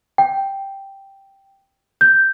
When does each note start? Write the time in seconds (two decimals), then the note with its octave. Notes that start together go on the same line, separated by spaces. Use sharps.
0.18 G5
2.01 G6